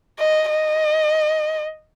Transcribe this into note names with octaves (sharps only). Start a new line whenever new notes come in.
D#5
D#5